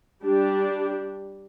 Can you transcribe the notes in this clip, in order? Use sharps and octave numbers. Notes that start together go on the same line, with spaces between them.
G3 D4 G4